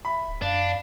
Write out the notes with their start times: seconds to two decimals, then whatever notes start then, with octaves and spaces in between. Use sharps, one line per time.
0.05 E5 B5
0.28 D1
0.42 F#2 D4 F5